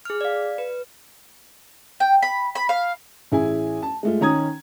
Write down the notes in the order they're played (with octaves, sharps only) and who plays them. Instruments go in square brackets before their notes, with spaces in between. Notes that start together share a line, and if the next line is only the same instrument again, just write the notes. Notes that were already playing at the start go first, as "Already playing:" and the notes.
[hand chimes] G#4 F6
D5 F5
B4
[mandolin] G5
B5
B5
F5
[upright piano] A1 E4 G#4 G#5
A5
G#3 A3 F4
D#3 C#4 A#5 D#6 G#6